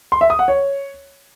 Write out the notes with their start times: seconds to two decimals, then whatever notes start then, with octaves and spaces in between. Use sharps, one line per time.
0.12 C6
0.21 E5
0.30 D#6
0.39 F#5
0.48 C#5